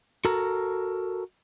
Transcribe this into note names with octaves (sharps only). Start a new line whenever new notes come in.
F#4 A4 A#4